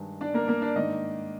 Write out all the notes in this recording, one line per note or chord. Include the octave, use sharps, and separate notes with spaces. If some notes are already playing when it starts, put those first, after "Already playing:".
Already playing: G2 D#3 G#3 D4
D4 D5
A#3 A#4
A#3 A#4
D4 D5
G#2 D#3 A#3 D4 D#4 D#5